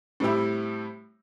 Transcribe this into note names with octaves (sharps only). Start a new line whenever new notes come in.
A2 G3 C4 E4 G4